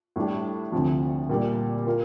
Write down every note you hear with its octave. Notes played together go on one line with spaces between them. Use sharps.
A2 G3 D4 G4
D2 C3 F3
A#2 G3 A#3
A#3 F4 A#4